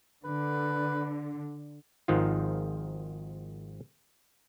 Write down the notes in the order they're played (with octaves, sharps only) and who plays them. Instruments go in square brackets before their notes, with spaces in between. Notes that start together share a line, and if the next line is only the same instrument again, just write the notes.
[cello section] D3 [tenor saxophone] B4
[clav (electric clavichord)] G#1 G#2 D#3 F3 F4